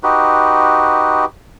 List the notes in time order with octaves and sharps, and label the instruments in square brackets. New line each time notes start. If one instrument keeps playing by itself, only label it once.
[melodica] D#4 F#4 G4 B4